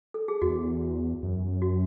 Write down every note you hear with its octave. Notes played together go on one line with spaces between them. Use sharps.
A4
G#4
E2 F#4
F#2
F#4